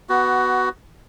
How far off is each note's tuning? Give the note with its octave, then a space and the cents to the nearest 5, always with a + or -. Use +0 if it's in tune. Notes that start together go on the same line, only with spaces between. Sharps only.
B3 +0 F#4 +15